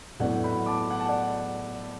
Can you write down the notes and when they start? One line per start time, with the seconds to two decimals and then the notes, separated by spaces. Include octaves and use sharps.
0.20 A2 F#3 B3 D5 F#5
0.44 F#5 B5
0.66 A5 D6
0.91 F#5
1.00 A5
1.09 D5 F#5